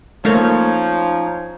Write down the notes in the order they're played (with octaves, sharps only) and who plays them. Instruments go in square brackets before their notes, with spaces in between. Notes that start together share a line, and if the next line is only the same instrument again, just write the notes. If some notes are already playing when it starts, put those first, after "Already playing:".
[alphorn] F3 [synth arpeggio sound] A3 A#3 [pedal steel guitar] C#4 D#4 C#5